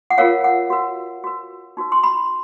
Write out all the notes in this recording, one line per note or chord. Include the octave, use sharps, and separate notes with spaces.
F#5
F4 A#4 C#5 F5
F#5
F#4 B4
F#4 B4
D#4 F#4 B4
C6
B5